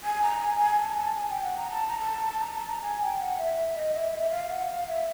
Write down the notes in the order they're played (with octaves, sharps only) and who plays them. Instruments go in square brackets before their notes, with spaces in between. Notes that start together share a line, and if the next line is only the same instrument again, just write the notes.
[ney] G#5
A#5
G#5
G#5
A5
A#5
A5
G#5
G5
F#5
A#5
A5
A#5
A5
A5
A#5
A5
A#5
G#5
G5
F#5
E5
E5
D#5
E5
E5
F5
F#5
F5
E5